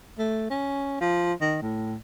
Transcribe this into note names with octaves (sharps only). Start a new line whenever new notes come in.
A3
C#4
F3
D#3
A2